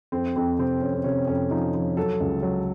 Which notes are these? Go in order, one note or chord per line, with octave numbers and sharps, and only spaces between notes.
F2 C4
F2 C4
C3 C4
F2 C#4
C4
C3 C#4
F2 C#4
F3 D#4
F3
F#3 A4
C#2
F#3